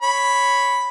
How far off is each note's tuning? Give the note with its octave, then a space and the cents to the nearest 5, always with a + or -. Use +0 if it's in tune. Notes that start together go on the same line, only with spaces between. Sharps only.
C#5 +0 B5 +0